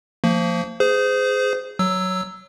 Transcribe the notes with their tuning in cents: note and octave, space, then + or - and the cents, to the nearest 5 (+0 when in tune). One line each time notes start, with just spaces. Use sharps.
F3 +0 A#3 -35
G#4 +0 C5 -30
F#3 +5 E6 +0